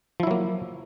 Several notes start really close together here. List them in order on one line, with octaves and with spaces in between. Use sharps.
F3 E4 F#3 A#3